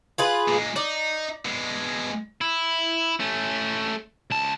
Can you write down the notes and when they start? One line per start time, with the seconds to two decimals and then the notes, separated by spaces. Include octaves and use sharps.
0.18 F4 G#4 B4
0.48 A#2 G#3
0.76 D#4 D5
1.46 B2 G#3
2.41 E4
3.20 A3 C#4
4.30 C#2 A5